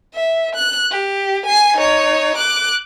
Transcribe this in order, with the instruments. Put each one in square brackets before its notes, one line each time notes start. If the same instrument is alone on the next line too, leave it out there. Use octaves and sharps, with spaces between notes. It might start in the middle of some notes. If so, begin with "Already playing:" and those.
[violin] E5
F#6
G4
G#5 C7
D#4 C#5
D6 F#6